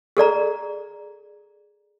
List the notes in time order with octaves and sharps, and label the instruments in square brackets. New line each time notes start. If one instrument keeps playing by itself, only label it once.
[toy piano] G#4 A4 D5 A#5